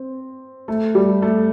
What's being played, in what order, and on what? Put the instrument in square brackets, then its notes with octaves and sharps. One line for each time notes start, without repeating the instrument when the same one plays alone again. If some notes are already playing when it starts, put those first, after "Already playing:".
Already playing: [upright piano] C4
A3
G3
A3